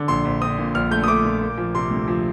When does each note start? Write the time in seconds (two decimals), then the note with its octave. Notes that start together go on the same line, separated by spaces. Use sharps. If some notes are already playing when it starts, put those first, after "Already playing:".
Already playing: D3
0.08 A#1 C6
0.25 A#1
0.41 C4 D#6
0.58 A#2
0.75 A#1 F6
0.91 A3 G6
1.04 D#6
1.08 A3 D6
1.25 A#2
1.42 A#3
1.58 F3
1.75 C3 C6
1.91 D2
2.08 F3